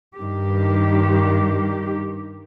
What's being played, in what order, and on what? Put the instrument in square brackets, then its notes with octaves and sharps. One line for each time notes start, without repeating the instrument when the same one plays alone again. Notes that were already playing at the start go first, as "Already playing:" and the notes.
[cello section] G2 D#3 G4